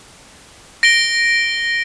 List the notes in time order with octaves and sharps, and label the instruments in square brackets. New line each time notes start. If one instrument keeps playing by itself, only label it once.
[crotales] A#6 D7 G7